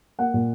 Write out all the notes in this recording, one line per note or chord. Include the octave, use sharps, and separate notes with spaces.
A#3 F#5
A#2